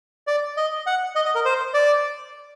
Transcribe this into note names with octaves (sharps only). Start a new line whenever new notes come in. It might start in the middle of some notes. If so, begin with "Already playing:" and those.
D5
D#5
F#5
D#5
D#5
A#4
C5
D5